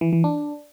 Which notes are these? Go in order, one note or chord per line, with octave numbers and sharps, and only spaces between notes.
E3
E3
D4